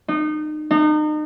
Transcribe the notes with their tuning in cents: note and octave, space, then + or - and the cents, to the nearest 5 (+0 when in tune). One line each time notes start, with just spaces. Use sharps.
D#4 -30
D#4 -35